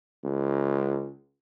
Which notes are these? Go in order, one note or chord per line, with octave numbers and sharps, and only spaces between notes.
C#2